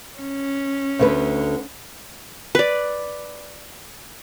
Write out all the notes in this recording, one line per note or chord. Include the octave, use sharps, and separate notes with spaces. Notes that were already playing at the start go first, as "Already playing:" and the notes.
C#4
D2 D3 B4
B4 D5